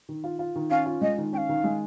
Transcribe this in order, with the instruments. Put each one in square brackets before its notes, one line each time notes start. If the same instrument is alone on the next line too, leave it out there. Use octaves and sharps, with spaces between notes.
[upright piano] D#3
F4
F4
D#3
[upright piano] C#4 [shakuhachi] F5
[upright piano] F4
[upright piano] G#3 [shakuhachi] D#5
[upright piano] D#3
[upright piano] C#4 [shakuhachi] G5
[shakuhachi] F5
[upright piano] D#3
G#3